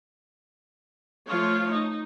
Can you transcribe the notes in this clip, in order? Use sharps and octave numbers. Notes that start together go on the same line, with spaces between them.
F3 A3 F4 C#5
D#4